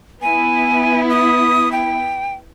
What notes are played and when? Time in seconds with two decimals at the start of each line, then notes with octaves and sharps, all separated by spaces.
0.22 B3 E4 G#5
1.10 D#6
1.72 G5